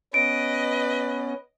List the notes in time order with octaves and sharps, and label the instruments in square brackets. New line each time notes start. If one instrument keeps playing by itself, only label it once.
[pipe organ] B3 C#4 [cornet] B4 [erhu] D#5 [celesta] D7